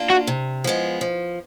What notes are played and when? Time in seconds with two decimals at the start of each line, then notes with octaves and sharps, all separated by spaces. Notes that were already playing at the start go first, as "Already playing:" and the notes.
Already playing: A#3 D4 F4
0.10 F#4
0.27 C3
0.64 F3 G#3 B3
1.01 F3